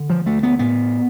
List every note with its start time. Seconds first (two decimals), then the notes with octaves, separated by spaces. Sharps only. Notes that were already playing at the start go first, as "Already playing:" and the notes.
Already playing: D3
0.10 F3
0.26 D2 A3
0.43 B3
0.59 A2 B3